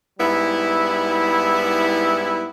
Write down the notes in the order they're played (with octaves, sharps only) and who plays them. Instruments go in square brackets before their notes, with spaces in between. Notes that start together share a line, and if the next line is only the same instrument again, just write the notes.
[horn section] G#2 G3 B3 E4